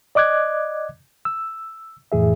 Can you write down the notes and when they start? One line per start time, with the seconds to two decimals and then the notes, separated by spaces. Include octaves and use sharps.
0.15 D5 D#5 D6 F#6 G#6
1.25 E6
2.12 F2 A2 E3 G#4 E5